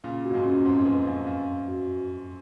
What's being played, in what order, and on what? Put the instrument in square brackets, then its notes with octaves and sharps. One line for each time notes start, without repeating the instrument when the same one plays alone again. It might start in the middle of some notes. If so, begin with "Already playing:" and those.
[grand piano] A#2 C#3 [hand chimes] F5
[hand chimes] F#4
[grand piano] G#2
F#2 A#2
[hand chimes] C#4
[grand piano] F2 G#2 [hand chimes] C#4
[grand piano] F#2 [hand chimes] B4
[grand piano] F#2 [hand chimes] F5
[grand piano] F#2 [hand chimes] F5
[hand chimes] B4
F#4